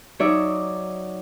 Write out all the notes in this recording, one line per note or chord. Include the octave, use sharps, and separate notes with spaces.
F#3 D#4 C#5 D5 E5